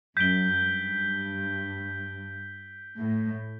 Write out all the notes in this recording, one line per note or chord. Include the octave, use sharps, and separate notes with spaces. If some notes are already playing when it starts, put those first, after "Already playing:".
F#2 G6 B6 D7 G7
G2
A2